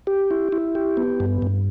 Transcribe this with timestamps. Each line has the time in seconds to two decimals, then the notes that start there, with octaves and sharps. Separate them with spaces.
0.07 G4
0.31 E4
0.52 E4
0.75 G4
0.97 B3
1.20 G2
1.42 G2